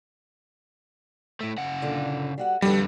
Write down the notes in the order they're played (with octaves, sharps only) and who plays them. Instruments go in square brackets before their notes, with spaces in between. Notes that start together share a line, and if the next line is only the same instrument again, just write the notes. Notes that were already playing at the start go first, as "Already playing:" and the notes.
[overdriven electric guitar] A2 A3
C#3 F#5
[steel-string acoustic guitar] A#2 D3 F4
G3 F#4 F#5
[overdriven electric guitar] F2 D3 [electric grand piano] G3 [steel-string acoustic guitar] F#4 A4 B4